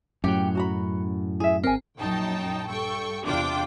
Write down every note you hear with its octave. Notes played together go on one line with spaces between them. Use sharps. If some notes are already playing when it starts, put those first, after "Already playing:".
F#2 A2 F#3 C#4 G4 G5
F#4 A#5 B5
E4 G#4 E5
G#1 C4 A#4 G#5
A#1 F#2 D#4 G5 A5
G2 A4 G5 C#6
E2 C3 D4 F4 G5 D6